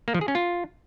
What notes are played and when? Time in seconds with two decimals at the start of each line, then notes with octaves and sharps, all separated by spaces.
0.08 A#3
0.14 F3
0.21 G#4
0.28 C#4
0.35 F4